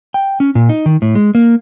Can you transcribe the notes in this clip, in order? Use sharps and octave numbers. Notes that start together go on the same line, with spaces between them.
G5
C#4
A#2
D#4
D#3
A2
G#3
A#3